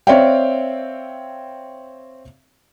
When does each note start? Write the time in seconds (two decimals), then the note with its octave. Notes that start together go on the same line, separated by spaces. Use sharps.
0.07 C4 C#5 D5 E5 F5 G5